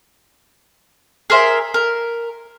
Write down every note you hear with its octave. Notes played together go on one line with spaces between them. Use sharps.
G#4 A#4 C5 E5
A#4